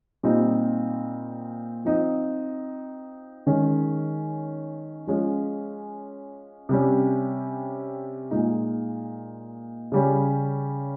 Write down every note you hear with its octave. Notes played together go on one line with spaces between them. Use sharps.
A#2 G3 C4 D#4
F3 C4 D#4
D#3 G#3 C#4
F3 G#3 C#4
C3 G3 C#4
A#2 G#3 D#4
C#3 G3 C#4